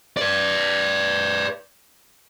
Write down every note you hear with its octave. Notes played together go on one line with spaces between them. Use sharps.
B4 D5